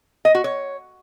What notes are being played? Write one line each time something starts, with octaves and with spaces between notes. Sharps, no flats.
D#5
F#4
C#5